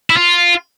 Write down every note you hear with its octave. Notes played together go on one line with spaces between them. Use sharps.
E4
F4